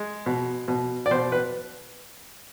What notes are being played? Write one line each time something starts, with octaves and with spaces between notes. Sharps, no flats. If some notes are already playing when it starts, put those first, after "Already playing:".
Already playing: G#3
B2
B2
D5
B2 C5
B4